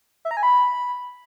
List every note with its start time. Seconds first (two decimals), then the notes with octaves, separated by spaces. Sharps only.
0.25 E5
0.31 A#5
0.37 G#5
0.43 B5